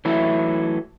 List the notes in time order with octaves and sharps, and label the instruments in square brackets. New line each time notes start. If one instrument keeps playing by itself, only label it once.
[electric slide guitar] E3 F#3 A3 E4